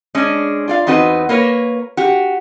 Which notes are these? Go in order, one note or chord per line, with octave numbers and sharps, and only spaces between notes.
G#3 C#4 D4
F4 D5 F5
E2 C4 D#4 F#4 B4
A#3 A#4 B4 C#5
F#4 G4